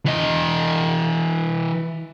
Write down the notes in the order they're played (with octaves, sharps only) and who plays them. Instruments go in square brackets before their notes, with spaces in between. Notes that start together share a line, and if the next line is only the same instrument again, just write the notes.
[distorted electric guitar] E3 D#5